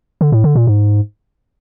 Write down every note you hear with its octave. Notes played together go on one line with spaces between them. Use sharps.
D3
A2
D3
A#2
G#2